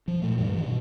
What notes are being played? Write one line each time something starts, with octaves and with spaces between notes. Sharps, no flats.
F3
A#2 A3
G2 E3 G3
G2 D#3
B2